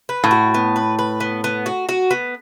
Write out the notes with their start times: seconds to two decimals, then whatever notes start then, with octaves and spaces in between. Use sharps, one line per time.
0.09 B4
0.24 A2
0.31 F#4
0.54 B3
0.76 B4
0.99 B4
1.20 B3
1.44 B3
1.66 F#4
1.89 F#4
2.11 B3